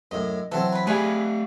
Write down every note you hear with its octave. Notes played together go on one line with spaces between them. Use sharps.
F#2 A2 D#5
E3 F#3 C4 A4
B4 B5
G3 A3 G#4 B4 F5 G#5